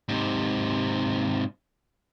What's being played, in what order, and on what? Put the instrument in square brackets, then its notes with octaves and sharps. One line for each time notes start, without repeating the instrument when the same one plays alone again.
[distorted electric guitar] G#2 C3